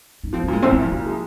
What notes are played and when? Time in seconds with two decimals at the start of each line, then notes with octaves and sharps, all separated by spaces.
0.23 D#4
0.33 F3 C4
0.43 A#3
0.48 A#2 G#3
0.62 C2 C4
0.73 A#3
0.77 C2 F3
0.92 A#2 F3
1.06 G#3